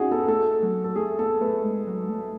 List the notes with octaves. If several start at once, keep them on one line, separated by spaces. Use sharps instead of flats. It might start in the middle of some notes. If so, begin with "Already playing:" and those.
Already playing: C#4 D#4 F#4 G#4
B3 A4
A3 A4
F#3
A4
A3 G#4
B3 A4
A3 B4
G#3
F#3
A3